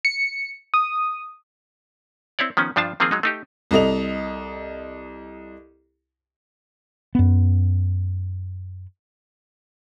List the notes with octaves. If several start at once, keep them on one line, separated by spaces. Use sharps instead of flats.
C#7
D#6
C4 E4 C#5 D5
D#3 F3 B3 C#4
G2 F3 D4 F4 A5
D#3 F3 A#3 C4 F4 G#4
F#3 G#3 D#4
A3 D#4 G4
C2 A4 D#5 F7
F#2 B3